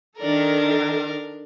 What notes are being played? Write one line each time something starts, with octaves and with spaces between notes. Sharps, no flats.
D#3 D4 A4 A#4